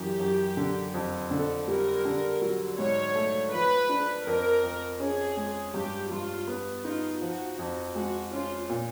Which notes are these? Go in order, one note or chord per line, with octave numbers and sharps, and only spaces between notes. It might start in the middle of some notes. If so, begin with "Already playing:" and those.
Already playing: F#2 E3 G4
F#2
D3
F2
D3 A4
G3 A#4
D3
F#3
G#2 C#5
A3
F3 B4
D4
F2 A#4
F2
C#4 G#4
G#3
G2 G4
G2 F4
B3
D#4 F4
F3 F#4
F2
G#3 F#4
C#4 F4
A#2